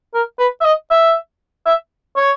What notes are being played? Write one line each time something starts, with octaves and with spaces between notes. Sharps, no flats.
A#4
B4
E5
D#5
E5
E5
C#5